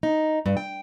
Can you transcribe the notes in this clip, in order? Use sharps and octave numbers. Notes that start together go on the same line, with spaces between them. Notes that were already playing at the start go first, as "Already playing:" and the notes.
D#4
G2
G5